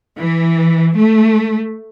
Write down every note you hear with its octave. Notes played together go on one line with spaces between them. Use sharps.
E3
A3